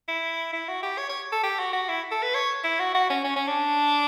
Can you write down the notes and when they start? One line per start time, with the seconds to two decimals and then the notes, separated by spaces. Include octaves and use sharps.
0.08 E4
0.53 E4
0.68 F#4
0.83 G4
0.98 C#5
1.09 C#5
1.32 A4
1.43 G4
1.59 F#4
1.73 F#4
1.89 E4
2.11 A4
2.22 B4
2.35 C#5
2.64 E4
2.80 F#4
2.94 F#4
3.10 C#4
3.24 C#4
3.36 C#4
3.47 D4